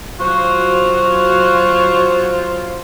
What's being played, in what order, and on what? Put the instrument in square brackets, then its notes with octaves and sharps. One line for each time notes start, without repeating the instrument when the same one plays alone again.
[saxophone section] F#3 F4 C5 [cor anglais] F#4